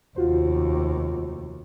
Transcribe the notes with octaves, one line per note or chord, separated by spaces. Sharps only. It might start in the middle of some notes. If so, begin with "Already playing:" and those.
F1 D#2 F4 F#4 C5